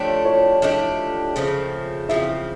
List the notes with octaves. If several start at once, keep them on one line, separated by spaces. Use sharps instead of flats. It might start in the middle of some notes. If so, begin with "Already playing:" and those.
Already playing: F3 A3 D4 G4 C#5
C#5
F3 A3 D4 G4 D#5
C#3 F3 A3 C4
C#3 F3 A3 C4 E5